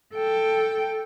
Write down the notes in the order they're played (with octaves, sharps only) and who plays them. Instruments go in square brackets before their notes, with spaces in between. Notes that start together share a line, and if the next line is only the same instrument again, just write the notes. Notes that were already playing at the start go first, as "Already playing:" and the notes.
[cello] A4 G5